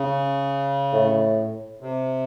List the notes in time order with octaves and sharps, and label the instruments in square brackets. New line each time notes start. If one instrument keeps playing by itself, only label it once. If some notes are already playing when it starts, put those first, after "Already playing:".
Already playing: [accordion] C#3
[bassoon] A2
[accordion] C3